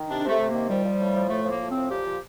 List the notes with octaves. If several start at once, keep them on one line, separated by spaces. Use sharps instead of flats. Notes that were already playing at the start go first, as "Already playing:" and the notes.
Already playing: D#3
C3 D4
C3 A3
C3
D#3 A#3
F3 G3
F3
A2
F3
A2 A3
F3
A#3
A2
C4
F3
A#2 G4
F3